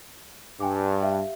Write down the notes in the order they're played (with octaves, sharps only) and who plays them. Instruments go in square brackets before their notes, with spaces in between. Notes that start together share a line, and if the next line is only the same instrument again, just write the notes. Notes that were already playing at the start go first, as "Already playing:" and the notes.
[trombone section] G2 [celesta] G5 G#5 D6
[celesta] G4 E5 F5